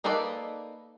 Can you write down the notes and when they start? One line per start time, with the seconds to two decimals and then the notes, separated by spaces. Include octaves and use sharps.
0.04 A#3 D#4 A4 B4 D5